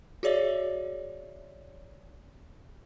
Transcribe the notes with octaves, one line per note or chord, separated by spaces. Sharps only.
F#4 G#4 C#5 D5 E5